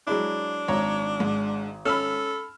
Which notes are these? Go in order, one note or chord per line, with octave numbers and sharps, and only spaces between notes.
F#3 G#3 D4 E4
G#1 C#5 A#5
G#2
C#4 A4 B5 E6 F6